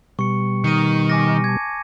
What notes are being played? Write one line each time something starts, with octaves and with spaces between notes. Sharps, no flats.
B2 G3 C#6 C#7
D#3 C#7 D#7
G#5 D6 A#6
A5 G#6